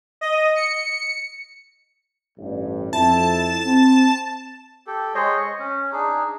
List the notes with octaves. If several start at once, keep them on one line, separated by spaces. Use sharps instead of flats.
D#5
C#7
A1 G2
F2 E4 A5
C4
G4 A4
G#3 C5 C#5 D#5
C#6
C#4
D4 D#4 G#4